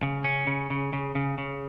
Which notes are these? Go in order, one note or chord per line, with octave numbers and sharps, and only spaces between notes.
C#3
C#4
C#3
C#3
C#3
C#3
C#3